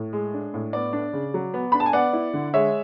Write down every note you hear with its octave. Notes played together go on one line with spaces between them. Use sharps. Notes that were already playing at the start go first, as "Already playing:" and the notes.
Already playing: A2
G#3
D4
A2
B3 D5
D4
C#3
F#3
B3
D4 B5
A5
G#5
B3 D5 F#5
E4
D3
G#3 C#5 E5